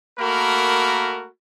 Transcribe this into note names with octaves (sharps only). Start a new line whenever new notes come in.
A3 A#3 F#4 A#4 B5